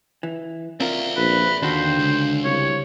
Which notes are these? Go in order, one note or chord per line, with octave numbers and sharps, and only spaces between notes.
E3
C4 F4 A#4 D5 E5
A#1 B4
D#2 D3 D4 F#4 C5
C#2
C2 C#5